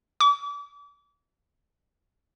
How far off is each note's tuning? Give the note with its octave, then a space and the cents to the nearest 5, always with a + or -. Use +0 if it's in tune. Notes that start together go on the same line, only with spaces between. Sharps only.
D6 -35